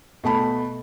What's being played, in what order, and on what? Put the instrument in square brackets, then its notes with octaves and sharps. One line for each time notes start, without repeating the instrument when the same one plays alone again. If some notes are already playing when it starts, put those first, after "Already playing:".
[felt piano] B2 A3 A5 B5